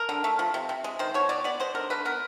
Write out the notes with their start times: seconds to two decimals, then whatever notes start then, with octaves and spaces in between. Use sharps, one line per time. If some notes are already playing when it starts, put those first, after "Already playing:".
Already playing: A#4
0.09 D3
0.24 A3
0.39 F3
0.54 C3
0.69 C3
0.84 G#3
0.99 D#3 C5
1.14 B2 C#5
1.29 B2 D5
1.44 B3 D5
1.60 G#3 C5
1.75 D3 A#4
1.90 D3 B4
2.05 B3 A#4